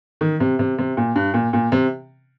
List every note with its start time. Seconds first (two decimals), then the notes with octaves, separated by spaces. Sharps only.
0.21 D#3
0.40 C3
0.59 C3
0.78 C3
0.97 A#2
1.16 G2
1.34 A#2
1.53 A#2
1.72 C3